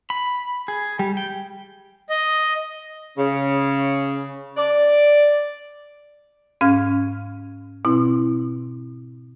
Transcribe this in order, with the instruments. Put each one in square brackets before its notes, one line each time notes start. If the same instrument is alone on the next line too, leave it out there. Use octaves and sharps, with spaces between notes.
[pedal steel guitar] B5
G#4
G3
G5
[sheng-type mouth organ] D#5
[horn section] C#3
D5
[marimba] G#2 C#4 F5 F6 G#6
B2 C4 E4